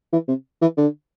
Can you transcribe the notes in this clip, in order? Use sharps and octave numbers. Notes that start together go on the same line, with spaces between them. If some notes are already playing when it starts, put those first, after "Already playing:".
E3
C3
E3
D3